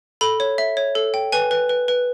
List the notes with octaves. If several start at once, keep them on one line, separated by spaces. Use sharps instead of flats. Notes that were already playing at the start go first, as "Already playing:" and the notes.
A4 B5
C#5
E5
C#5
A4
G5
B4 G#5
B4
B4
B4